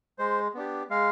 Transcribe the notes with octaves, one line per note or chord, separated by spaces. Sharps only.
G#3 C5
B3 D4 G4
G#3 F5